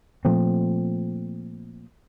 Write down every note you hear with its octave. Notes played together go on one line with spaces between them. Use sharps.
A#2 F3 A3 C4